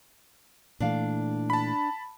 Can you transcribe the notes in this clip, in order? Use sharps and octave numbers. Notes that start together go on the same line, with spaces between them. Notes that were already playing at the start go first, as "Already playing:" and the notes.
A#2 E3 A3 D4 D5 F5
A5 B5